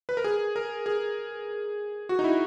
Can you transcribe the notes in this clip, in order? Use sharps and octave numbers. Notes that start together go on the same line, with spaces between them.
B4
A#4
G#4
A#4
G#4
F#4
D#4
E4